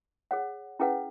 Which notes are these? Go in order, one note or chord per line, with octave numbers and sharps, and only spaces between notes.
G#4 C#5 F#5
C#4 E4 G#4 B4 F#5